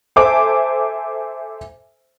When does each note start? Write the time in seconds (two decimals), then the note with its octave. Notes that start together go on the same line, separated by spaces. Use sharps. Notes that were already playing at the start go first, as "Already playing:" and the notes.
0.16 A4 C5 E5 G#5 D6